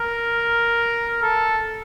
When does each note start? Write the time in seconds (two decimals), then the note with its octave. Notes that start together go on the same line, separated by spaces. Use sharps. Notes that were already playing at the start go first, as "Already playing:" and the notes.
Already playing: A#4
1.22 A4